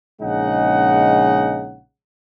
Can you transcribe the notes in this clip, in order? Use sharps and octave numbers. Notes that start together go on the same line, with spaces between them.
A#1 C#3 G#3 D#4 F#5